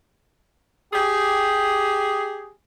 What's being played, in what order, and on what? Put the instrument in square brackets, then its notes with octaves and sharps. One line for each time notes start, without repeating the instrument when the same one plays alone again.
[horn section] G4 G#4